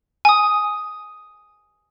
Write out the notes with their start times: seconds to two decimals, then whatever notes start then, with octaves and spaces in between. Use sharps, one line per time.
0.25 G#5 D#6